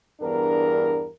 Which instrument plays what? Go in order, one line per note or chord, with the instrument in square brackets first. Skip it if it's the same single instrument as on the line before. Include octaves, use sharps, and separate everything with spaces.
[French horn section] E2 G2 B3 D4 A#4